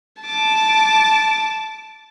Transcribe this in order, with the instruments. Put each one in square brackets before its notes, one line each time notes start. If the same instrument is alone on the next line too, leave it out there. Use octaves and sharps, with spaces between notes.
[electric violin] A5 D6